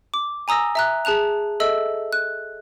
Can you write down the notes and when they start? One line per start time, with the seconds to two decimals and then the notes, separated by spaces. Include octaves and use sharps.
0.14 D6
0.48 G#5 A#5 D#6 E6 A#6
0.75 E5 A#5 F#6
1.05 G#4 A5 F#6 F7
1.60 A4 D#5 E5 E6
2.13 F#6